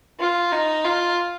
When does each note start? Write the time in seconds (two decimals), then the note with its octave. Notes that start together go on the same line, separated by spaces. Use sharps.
0.20 F4
0.52 D#4
0.85 F4